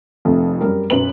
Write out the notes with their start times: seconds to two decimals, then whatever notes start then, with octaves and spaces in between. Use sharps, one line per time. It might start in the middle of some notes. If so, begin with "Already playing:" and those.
0.25 F1 F2 A3
0.61 F#2 G3 A#4
0.90 B1 F#2 C#4 B4 F#7